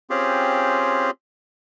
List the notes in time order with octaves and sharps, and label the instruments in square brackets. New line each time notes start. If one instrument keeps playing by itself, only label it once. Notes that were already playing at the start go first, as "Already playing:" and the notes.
[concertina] C4 C#4 F4 G4 G#4